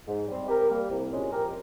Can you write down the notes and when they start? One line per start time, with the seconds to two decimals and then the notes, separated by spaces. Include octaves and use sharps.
0.08 G#2
0.28 G3 C4
0.49 C3 G4 A#4
0.70 G3 A#3
0.90 C2
1.11 A#2 G#3 C#4
1.32 F2 G4 A#4